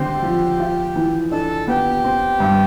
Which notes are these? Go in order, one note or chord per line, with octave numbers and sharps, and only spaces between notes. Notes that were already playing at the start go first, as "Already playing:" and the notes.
Already playing: D3 C4 G4
F3
F4
E3
D4 A4
B3 G4
C4
G2